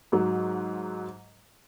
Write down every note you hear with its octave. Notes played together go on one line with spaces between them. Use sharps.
G#2 F#3